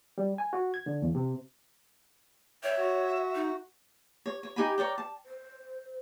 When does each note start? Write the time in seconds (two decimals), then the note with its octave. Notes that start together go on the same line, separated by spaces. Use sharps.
0.18 G3
0.38 G#5
0.53 F#4
0.74 G#6
0.86 D3
1.02 E2
1.15 C3
2.63 C#5 E5 G5
2.78 F#4
3.35 D#4
4.26 C#5
4.43 C#5
4.56 D#4 G4 G#5 B5
4.78 A#4 C#5 D5 G5
4.98 A5
5.26 C5